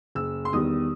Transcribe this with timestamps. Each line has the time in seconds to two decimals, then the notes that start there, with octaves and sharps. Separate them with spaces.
0.15 F#1 E6
0.45 C6
0.53 E2 D#3 G3 D#6